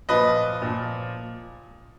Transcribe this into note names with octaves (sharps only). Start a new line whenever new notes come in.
A#2 F3 B4 D#5
A#2 F3